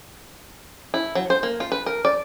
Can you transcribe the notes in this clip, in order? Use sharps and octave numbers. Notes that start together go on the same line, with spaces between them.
E4
F#3
C5
A#3
F4
B4
A#4
D5